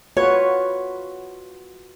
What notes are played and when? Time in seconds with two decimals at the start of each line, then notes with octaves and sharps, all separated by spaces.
0.17 F4 F#4 B4 C#5